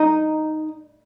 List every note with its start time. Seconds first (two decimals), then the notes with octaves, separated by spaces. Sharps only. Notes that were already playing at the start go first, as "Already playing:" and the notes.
Already playing: D#4